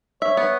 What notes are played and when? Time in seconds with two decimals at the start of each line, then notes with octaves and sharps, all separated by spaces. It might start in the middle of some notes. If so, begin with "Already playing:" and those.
0.22 C#5 E5
0.37 B3